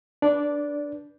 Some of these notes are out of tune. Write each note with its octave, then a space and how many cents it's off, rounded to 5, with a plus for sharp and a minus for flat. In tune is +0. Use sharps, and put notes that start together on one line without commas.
D4 +0 B4 -15 D5 -15